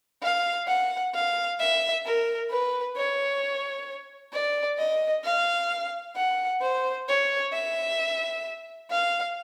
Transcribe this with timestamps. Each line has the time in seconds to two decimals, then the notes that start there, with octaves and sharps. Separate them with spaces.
0.23 F5
0.67 F#5
1.14 F5
1.60 E5
2.05 A#4
2.51 B4
2.97 C#5
4.33 D5
4.78 D#5
5.24 F5
6.16 F#5
6.61 C5
7.08 C#5
7.53 E5
8.91 F5